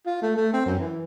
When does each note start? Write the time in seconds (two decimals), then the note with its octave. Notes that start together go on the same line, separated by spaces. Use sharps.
0.06 F4
0.22 A3
0.37 A3
0.53 C4
0.66 F#2
0.79 E3